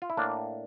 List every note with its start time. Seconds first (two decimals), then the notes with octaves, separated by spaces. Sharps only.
0.02 F4
0.10 E4
0.17 A2 A#3 D4